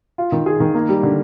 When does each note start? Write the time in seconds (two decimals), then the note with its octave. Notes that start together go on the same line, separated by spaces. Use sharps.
0.18 F4
0.32 D#3
0.46 G#4
0.60 D#3
0.74 A#3
0.89 G3
1.03 D3